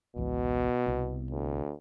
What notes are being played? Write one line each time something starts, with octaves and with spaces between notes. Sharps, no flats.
G#1 C#2 B2 E3
C2 B3
D2